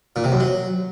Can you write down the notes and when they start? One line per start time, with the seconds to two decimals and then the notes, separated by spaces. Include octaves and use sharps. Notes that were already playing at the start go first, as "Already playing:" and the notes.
0.16 A#2
0.24 C3
0.32 F#2
0.40 F#3